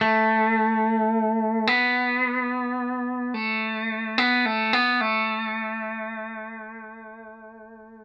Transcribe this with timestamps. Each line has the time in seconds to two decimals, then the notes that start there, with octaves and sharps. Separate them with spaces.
0.01 A3
1.67 B3
3.34 A3
4.18 B3
4.46 A3
4.73 B3
5.01 A3